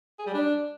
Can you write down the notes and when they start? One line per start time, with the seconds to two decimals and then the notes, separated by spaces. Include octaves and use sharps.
0.19 G#4
0.27 G3
0.34 D4